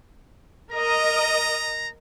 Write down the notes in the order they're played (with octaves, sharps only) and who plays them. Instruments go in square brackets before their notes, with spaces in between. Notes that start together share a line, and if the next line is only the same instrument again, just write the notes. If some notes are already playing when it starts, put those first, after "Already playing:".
[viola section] A#4 D#5 [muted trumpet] A#5